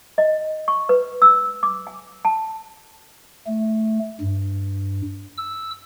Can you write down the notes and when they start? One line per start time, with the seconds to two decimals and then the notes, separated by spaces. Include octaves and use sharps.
0.18 D#5
0.68 C#6
0.89 B4
1.22 E6
1.63 D6
1.87 G#5
2.25 A5
3.47 A3
4.21 G2
5.37 E6